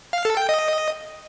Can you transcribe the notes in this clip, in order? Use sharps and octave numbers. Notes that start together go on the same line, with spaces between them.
F5
A4
G5
D#5